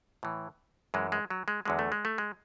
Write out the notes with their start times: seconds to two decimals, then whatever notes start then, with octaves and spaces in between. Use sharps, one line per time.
0.23 A2 E3
0.94 F#2 E3 G#3
1.12 G#3
1.30 F#3
1.48 G#3
1.65 E2 D3 F#3 G#3
1.79 A3
1.92 G#3
2.05 A3
2.18 G#3